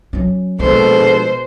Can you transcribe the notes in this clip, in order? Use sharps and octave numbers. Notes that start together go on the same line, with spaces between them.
F#3 C#4
A#1 B2 G#3 A4 C5